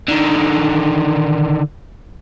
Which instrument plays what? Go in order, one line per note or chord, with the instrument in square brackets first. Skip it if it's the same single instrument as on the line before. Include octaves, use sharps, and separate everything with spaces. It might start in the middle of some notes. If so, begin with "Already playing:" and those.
[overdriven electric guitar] D3 D#3